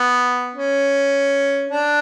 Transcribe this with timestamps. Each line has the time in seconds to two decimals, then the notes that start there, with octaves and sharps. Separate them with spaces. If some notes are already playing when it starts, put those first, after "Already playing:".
Already playing: B3
0.56 C#4
1.69 D4